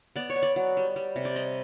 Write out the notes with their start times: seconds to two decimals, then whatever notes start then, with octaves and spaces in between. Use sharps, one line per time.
0.16 B3 D5
0.30 C#5
0.36 B3
0.43 D5
0.56 F#3
0.77 G3
0.96 G3
1.16 C3
1.25 D5
1.36 G3 D#5